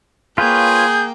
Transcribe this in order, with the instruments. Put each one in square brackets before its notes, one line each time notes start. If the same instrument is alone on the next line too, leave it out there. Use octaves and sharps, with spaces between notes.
[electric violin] A#3 G5 [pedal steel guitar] F4 B4 C#5 [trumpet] G#4 [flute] G6